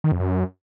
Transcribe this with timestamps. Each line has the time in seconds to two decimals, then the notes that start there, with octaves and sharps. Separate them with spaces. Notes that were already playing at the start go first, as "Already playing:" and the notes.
0.04 D#3
0.12 F2
0.20 F#2